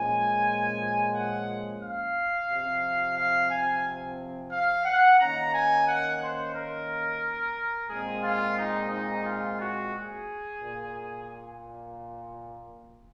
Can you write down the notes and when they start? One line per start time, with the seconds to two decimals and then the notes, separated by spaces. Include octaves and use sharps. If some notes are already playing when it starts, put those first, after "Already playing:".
Already playing: A#2 F3 G#3 C#4 G#5
1.13 F#5
1.82 F5
2.49 C3 F3 C4
3.17 F5
3.51 G#5
4.52 F5
4.86 F#5
5.19 D#3 A#3 C#4 A#5
5.53 G#5
5.87 F#5
6.21 C5
6.55 A#4
7.90 A#2 G#3 C4 G#4
8.24 F4
8.57 D#4
8.91 D#4
9.24 F4
9.59 F#4
9.92 G#4
10.60 A#2